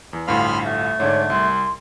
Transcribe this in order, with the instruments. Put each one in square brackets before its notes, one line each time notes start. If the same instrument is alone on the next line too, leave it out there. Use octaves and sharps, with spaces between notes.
[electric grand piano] E2
[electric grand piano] G1 D2 A2 [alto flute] F5 [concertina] B5 C6 F6
[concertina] A3
[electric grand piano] G#2 D3 D4 [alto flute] C#5
[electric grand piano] C2 [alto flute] C6